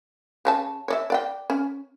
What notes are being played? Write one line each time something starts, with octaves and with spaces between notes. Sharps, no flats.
C#3 C#5 A5
C#5 D5 E5
D5 F#5 G5
C#4